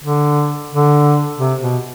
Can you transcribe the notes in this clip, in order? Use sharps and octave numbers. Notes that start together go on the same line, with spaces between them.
D3
D3
C3
B2